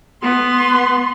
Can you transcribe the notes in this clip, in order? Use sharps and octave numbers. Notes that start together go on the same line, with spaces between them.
B3 C6